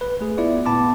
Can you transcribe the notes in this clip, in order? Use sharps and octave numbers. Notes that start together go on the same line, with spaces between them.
B4
A3 G#4
B3 E4 F4 D5 E5
A#2 B3 A5 B5 D6